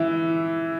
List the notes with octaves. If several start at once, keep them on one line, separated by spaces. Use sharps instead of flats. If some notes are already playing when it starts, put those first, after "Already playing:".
Already playing: E3 E4